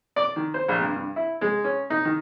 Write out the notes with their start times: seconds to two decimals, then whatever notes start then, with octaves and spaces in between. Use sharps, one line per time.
0.16 D5
0.36 D#3
0.54 C5
0.68 A#1
0.81 G2
0.96 G2
1.16 E4
1.41 G#3
1.64 C#4
1.90 D#4
2.05 D#3